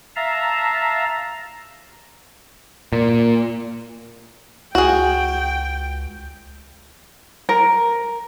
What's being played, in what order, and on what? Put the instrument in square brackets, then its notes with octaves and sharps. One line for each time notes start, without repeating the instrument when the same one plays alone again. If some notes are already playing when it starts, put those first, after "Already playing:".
[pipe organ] E5 F5 A5 A#5
[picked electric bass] A#2
[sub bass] C#2 [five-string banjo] F#4 G#4 [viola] G5
[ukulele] A#4